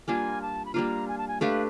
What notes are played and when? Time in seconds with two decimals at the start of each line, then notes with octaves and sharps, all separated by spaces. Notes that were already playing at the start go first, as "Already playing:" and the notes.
0.08 G3 A#3 D4 F4 G#5
0.42 A5
0.66 B5
0.74 G3 A#3 D4 F4 A#5
1.08 G#5
1.18 A5
1.28 G#5
1.41 A3 D4 G4 B4 F5